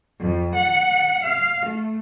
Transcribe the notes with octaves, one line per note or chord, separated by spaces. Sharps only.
F2
F#5
F5
A3